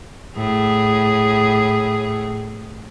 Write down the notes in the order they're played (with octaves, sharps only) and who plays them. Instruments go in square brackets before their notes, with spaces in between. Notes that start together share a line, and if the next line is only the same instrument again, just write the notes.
[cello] A2 G#4